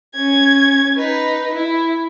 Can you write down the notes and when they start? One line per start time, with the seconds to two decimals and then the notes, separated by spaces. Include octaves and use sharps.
0.14 C#4 G#6
0.97 D#4 B4
1.54 E4